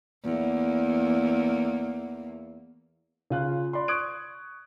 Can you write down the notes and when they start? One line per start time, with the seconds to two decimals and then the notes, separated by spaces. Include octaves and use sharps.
0.24 E2 A#3
3.30 C#3 F4 F#6
3.73 D5 B5 C6
3.88 C#6 D#6 F#6 G#6 D7